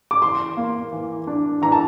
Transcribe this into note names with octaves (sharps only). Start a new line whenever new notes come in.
D6
E3 C6
A#3
E3
D4
E3 A#5
A5